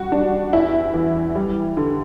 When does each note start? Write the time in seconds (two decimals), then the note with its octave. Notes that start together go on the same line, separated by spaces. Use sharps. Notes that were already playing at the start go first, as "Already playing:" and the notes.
Already playing: G3 F#4
0.12 G3 D4
0.53 E2 E4
0.94 E3
1.35 G3
1.77 D3